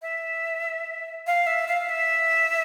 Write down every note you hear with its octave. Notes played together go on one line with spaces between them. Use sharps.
E5
F5
E5
F5
E5